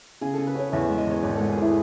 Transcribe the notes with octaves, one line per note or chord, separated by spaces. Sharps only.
C#3 G#4
C#3 A4
B4
C#4 C#5
E2 E5
G#3 E5
D#5
E2 C#5
G#1 B4
G#2 A4
G#4
E3 E4